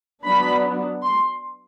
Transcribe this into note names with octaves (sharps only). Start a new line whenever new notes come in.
F#3 B3 D4 B5
C6